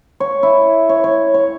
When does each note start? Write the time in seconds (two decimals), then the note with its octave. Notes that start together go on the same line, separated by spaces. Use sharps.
0.20 C#5
0.43 E4
0.89 C#5
1.04 C#5
1.34 C#5